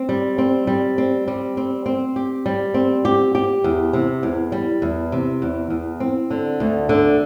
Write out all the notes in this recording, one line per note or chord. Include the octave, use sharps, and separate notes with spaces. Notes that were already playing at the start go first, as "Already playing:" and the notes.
Already playing: C4
G3
C4
G3
C4
G3
C4
C4
G4
G3
C4
G4
G4
E2
C3
E2
G3
E2
C3
E2
E2
C4
D3
D2
D3